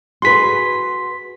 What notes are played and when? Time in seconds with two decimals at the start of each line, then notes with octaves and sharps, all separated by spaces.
0.22 F#4 G#4 B4 C6 B6